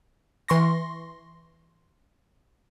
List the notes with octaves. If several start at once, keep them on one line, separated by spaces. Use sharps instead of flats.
E3 C6 C#6 A#6